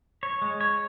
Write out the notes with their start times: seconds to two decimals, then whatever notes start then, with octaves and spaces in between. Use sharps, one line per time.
0.23 C#5
0.42 G#3
0.61 C#5